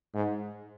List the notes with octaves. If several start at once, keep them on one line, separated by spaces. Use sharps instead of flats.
G#2